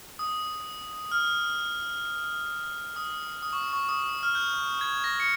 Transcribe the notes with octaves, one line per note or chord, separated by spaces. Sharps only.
D#6
F6
D#6
D#6
C#6
C#6
D#6
F6
G6
G#6
A#6
C#7